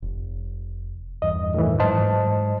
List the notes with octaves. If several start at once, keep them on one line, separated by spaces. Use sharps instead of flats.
F1
E2 G2 D#5
A2 D#3 E3
G#2 F#3 G#3 C5 D#5 A5